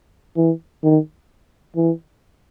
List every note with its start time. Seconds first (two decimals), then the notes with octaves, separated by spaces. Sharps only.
0.36 E3
0.83 D#3
1.76 E3